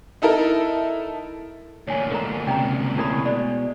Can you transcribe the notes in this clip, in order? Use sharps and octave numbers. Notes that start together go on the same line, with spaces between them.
D#4 E4 A4 A#4
D2 A#2 C#5 G#5
D3 G#3 A#4 A#5
C#2 C3 G5 A#5
C3 C#4 E4 G#4 A#4 B5
B2 G#3 D5